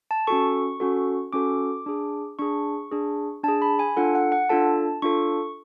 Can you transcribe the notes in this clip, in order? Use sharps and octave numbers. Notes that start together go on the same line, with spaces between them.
A5
C#4 F#4 A4 C#6
C#4 F#4 A4
C#4 F#4 A4 D6
D4 G#4
D4 G#4 C#6
D4 G#4
D4 G#4 A5
B5
G#5
D4 F4 A4 F#5
F#5
F#5
D4 F4 A4 A5
D4 F4 A4 C#6